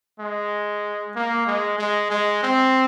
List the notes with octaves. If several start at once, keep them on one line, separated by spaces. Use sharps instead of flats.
G#3
A#3
G#3
G#3
G#3
C4